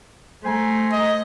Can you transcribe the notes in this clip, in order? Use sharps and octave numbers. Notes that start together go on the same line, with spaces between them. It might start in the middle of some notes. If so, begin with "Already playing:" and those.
A3 C5 G#5 A#5
D#5